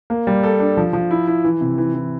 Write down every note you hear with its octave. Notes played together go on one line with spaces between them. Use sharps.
A#3
G3
A4
D4
F3
F3
E4
E4
E3
C3
E3
E3